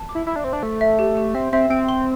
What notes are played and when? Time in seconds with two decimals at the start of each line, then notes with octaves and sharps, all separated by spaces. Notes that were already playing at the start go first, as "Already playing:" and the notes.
Already playing: A5
0.09 D6
0.15 E4
0.27 E4 E5
0.36 D4
0.44 C4 C5
0.53 D4
0.63 A3 E5
0.81 E5
0.99 G4
1.17 G4
1.35 C4 E5
1.52 C4 E5
1.70 C4 G5
1.89 C6